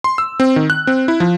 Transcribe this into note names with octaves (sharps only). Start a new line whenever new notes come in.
C6
E6
C4
D#3
F#6
C4
E4
F3